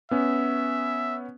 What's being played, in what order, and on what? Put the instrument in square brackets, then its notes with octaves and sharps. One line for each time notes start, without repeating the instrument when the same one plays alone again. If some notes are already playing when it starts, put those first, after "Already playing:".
[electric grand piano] B3 C#4 [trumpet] E5